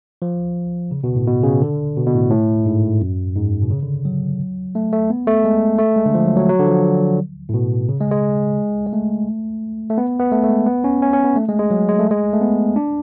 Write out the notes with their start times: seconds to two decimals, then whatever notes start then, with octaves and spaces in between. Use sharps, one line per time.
0.22 F3
0.91 C#3
1.04 B2
1.15 A2
1.27 B2
1.43 C#3
1.62 D3
1.97 B2
2.07 B2
2.14 A2
2.30 A2
2.66 G#2
3.01 F#2
3.36 G#2
3.62 B2
3.70 C#3
3.82 D3
4.05 F#3
4.75 A3
4.93 A3
5.10 B3
5.27 A3
5.44 G#3
5.79 A3
5.96 G#3
6.06 D3
6.14 F3
6.26 F#3
6.37 F#3
6.49 F#3
6.59 D3
6.66 F3
7.49 A2
7.54 B2
7.89 C#3
8.00 G#3
8.11 G#3
8.87 G#3
8.93 A3
9.90 A3
9.98 B3
10.20 B3
10.32 A3
10.44 A3
10.49 G#3
10.66 B3
10.84 C#4
11.02 C#4
11.14 C#4
11.25 B3
11.36 A3
11.49 G#3
11.59 G#3
11.71 F#3
11.89 G#3
11.99 A3
12.11 G#3
12.33 A3
12.41 B3
12.76 D4